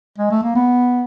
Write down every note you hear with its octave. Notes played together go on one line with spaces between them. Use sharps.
G#3
A3
A#3
B3